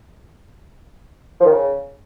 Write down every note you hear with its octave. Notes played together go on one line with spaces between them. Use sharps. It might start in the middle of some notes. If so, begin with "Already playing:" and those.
F3
D#3
C#3